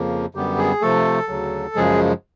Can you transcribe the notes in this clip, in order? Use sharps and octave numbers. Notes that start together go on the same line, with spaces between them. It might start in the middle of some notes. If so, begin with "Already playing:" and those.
Already playing: F2 C#3 F3 A#3
F#2 D3 G3 B3 G4
G#4
C3 F3 A3 A4
D2 C#3 F#3
F#2 C#3 F3 G#3 G#4